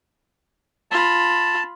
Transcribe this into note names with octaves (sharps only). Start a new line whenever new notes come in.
F4 A5 B5